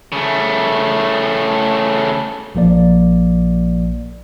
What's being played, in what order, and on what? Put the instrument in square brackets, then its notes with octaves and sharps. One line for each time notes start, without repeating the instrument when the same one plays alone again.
[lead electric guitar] C#3 A3
[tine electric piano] A#1 F3 A#3 D5